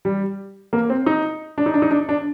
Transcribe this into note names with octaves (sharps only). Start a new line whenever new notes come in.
G3
A#3
C4
D#4
D4
D#4
D4
D#4
D4
D4